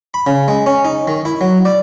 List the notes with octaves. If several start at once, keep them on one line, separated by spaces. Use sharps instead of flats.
B5
C#3
G#3
C#4
D#4
D#3
E4
F#3
D5